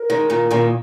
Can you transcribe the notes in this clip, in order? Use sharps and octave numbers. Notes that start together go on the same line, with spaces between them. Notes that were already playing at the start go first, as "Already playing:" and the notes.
Already playing: A#4
D#3 G#3
A#2 D#3
A#2 D#3